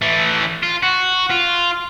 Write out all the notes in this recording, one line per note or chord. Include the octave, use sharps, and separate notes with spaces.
E3 A3
F4
F#4
F4